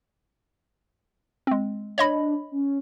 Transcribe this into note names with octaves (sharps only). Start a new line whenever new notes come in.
G#3 C4
D4 C#5 D#5 B5
C#4